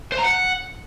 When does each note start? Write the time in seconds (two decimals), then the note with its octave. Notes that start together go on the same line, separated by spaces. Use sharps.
0.12 C5
0.18 A#5
0.24 F#5